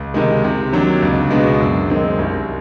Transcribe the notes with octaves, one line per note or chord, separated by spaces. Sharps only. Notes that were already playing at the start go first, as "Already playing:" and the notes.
Already playing: C#2
C3 D#3 G#3
C3
D#3 F#3 A#3 D4
C#2
B2 G#3 B3 D4
F#2
D#3 G#3 C4
C2